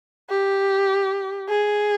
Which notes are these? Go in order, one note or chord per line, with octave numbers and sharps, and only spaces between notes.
G4
G#4